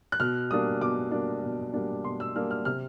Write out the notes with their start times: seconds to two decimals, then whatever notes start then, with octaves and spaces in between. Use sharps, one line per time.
0.12 F#6
0.20 B2 F6
0.51 G3 A#3 D4 D#6
0.81 B2 D6
1.11 G3 A#3 D4
1.43 B2
1.74 G3 A#3 D4
2.04 B2 C6
2.20 E6
2.36 G3 A#3 D4 F6
2.51 F6
2.65 C3 F6